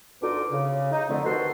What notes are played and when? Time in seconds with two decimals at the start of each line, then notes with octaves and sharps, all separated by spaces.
0.22 D2 B2 D3 D#4 F4 D6
0.51 C#3
0.92 D#4
1.09 F2 D3 A3
1.25 D#2 F#4 A4 B4 C5 C6